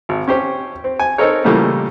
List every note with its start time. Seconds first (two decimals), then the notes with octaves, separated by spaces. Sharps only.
0.09 G#1
0.28 C#4 G4 C5
0.84 C4
0.99 G#5
1.18 C4 D#4 A4 A#4 C#5
1.44 A#2 C#3 E3 G3 A3 A#3